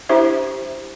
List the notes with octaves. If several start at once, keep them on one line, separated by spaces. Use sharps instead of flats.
D4 E4 G4 C5 E5